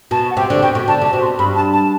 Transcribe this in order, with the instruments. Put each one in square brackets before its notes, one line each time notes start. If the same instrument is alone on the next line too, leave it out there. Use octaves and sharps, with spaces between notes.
[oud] B2 [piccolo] A5
[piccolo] F#5
[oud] C3 [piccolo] G5
[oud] D3
[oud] B2 [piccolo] G5
[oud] B2
[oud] D3 [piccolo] A5
[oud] C3 [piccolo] A5
[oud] B2
[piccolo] C6
[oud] G2 [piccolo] B5
[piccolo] A5
A5